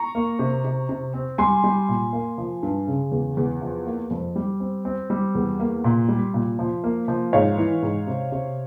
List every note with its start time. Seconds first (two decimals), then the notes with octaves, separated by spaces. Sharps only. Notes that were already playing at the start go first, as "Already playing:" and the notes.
Already playing: A#5 C#6
0.15 A#3
0.39 C3
0.64 C3
0.89 C3
1.14 C4
1.38 G3 G#5 C6
1.64 G3
1.89 A#2
2.13 A#3
2.38 F3
2.63 G2
2.87 C#3
3.12 E2
3.37 E2
3.61 F3
3.87 A#3
4.11 F2
4.36 G3
4.60 C4
4.85 C4
5.10 G3
5.35 E2
5.60 A#3
5.84 A#2
6.08 G3
6.34 A#2
6.59 F3
6.84 A#3
7.08 F3
7.33 G#2 C#5 F5
7.58 E3
7.82 G#2
8.07 C3
8.32 C3